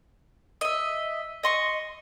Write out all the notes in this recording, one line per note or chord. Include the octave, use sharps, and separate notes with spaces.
D#5 E5
D#5 C6 C#6